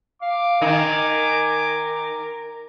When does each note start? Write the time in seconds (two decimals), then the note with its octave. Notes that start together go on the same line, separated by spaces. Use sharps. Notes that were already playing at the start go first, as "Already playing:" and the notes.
0.22 F5 D6
0.62 D#3 D#4 A#4 G#5